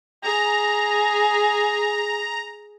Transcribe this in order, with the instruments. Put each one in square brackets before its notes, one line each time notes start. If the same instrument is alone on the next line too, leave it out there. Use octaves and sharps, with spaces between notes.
[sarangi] G#4 [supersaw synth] A#5